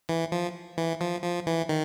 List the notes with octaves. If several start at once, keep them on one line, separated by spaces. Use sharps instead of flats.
E3
F3
E3
F3
F3
E3
D#3